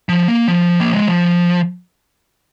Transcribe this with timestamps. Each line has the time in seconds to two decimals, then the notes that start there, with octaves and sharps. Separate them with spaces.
0.09 F3
0.28 A#3
0.48 F3
0.80 A#3
0.93 G#3
1.07 F3